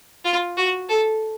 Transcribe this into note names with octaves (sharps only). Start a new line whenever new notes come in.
F4
F#4
A4